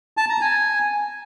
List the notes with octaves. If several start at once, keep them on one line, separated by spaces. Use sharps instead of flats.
A5
A#5
G#5